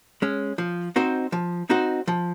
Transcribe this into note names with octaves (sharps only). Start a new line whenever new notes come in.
G#3 C#4
F3
C4 D#4 F#4 C5
F3
C4 D#4 F#4 C5
F3